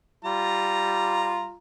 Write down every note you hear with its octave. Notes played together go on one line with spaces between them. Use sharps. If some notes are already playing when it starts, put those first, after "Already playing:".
G3 F4 A#5